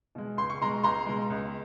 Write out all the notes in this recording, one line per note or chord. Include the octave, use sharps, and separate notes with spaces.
B2 G#3
C#2 C6
C#6
B2 G#3 A#5 C6
C#2 A#5 C6
B2 G#3
C#2